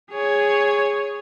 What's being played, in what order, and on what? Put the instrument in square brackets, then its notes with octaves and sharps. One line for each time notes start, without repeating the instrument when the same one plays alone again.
[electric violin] G#4 C#5